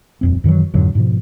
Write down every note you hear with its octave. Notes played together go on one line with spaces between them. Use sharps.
D#1 F2 C4
F#2 D#3 E3 F#3
F2 G#2 D3 F#3
G#2 B2 F3